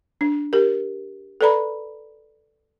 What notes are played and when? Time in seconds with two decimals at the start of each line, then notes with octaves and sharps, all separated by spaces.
0.21 D4
0.53 G4 A#4
1.41 A4 B4 D5 A#5 B5